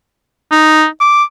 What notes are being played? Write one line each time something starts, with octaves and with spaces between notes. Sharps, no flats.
D#4
D6